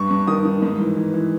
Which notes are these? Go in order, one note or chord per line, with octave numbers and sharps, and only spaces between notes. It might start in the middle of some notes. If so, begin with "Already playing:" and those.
Already playing: G2 C#6
G2
D#3 D#6
D#3
G#2
E3
E3
E3